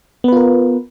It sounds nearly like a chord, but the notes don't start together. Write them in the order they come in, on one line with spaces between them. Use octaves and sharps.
B3 B4 F4 A#4